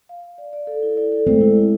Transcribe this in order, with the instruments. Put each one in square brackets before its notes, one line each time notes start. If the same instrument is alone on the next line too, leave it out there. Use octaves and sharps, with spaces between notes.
[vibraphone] F5
F5
D5
D5
A4
E4
D5
A4
[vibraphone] G#3 [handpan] A3 C4
[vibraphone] E4
G#3